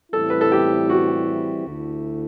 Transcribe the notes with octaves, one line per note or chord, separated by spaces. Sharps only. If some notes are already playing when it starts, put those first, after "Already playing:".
A2 E3 G3 C4 E4 A4
B4
A4
G4
F#4
D2 D3 A3 E4